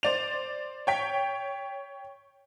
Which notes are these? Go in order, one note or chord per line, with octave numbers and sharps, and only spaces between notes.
C5 D5 F7
C#5 G5 B6